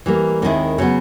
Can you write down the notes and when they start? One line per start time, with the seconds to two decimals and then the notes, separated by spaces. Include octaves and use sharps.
0.06 E3 G3 A#3
0.42 D#2 D#3 G#3 C4 E4
0.78 C#3 F#3 B3